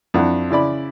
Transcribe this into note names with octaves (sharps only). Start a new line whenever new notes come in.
F2 D4 E4 F#5
C#3 E4 D5 B5